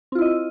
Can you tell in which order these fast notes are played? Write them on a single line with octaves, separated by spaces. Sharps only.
C4 F4 E4 D#5